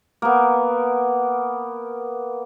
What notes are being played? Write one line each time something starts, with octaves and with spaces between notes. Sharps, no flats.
A#3 B3